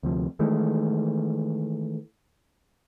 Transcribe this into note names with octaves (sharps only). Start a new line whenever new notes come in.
D2 C3 F3
D#3 E3 G#3 A3